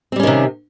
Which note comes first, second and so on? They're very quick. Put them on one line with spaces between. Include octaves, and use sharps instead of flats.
C4 G3 C#4 D#3 C3